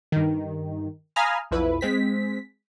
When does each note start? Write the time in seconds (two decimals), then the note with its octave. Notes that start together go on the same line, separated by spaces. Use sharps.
0.12 G2 D#3
1.16 F5 G#5 A#5 B5 D#6 F6
1.51 B1 F2 E4 B4
1.81 G#3 C4 B6